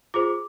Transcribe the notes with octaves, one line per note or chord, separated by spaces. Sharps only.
F4 G#4 C5 D6